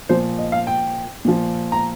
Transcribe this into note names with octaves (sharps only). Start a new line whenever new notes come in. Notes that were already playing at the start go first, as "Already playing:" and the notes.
A#2 F3 C5
D#5
F5
G5
A#2 F3
A#5